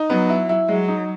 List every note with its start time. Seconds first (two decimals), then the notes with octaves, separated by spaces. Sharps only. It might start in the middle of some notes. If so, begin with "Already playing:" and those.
Already playing: D#4
0.10 F#3 B3
0.29 E4
0.49 E4
0.68 F#3 G#3
0.88 D#4